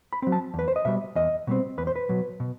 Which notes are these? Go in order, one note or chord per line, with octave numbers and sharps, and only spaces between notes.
B5
F#3 C4
A5
E2 B4
C5
D#5
B2 G3 E5
E2 D#5
B2 G3 C4
E2 B4
C5
B4
B2 F#3
B2